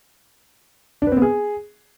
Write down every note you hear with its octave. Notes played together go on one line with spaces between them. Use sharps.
D4
B4
C4
B3
G#4